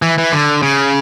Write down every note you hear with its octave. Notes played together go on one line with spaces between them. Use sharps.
E3
E3
D3
C#3